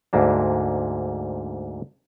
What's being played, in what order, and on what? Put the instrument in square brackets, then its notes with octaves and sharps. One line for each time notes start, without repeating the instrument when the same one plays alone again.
[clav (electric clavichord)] D2 G#2 A#3 D4